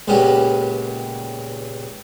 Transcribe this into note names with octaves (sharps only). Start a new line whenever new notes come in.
C#2 A#2 C#3 B3 G4 A#5